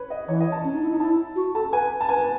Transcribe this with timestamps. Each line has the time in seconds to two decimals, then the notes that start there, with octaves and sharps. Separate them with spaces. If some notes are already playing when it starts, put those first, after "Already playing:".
Already playing: B4 C#5
0.10 D#5
0.28 E3 C#5
0.40 D#5
0.52 A5
0.64 C#4
0.74 D#4
0.82 E4
0.92 D#4
1.00 E4 A5
1.36 F#4
1.55 A4 A5
1.73 B4 G#5
2.01 A5
2.09 B4 G#5
2.21 B4